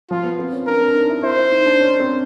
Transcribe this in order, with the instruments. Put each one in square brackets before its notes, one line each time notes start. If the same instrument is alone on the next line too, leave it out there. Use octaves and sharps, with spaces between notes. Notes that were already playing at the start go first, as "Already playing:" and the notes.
[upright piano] F3 [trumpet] F4
[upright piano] B3
C4
C#4
[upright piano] D4 [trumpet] A#4
[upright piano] D4
D#4
E4
[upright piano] E4 [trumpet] C5
[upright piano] E4
D#4
D4
C#4
C4